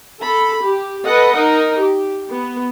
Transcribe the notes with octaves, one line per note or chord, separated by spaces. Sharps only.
A4 B5
G4
A4 B4 D#5 F#5
D#4 A#4
G4
B3